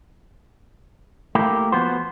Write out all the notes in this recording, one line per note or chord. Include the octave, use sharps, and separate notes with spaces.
A3 A#3 E4 G4
F3 B3 F#4 C5